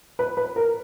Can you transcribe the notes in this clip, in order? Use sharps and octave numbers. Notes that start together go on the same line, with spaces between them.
B4
B4
A#4